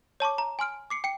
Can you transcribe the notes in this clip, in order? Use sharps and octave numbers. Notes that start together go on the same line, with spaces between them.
C#5 A5 C#6 D6
A#5
G#5 C6 F6 D7
D6 C7 C#7
G5 C7 C#7